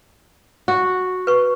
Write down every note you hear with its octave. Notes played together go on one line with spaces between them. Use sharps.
F#4
B4 C#6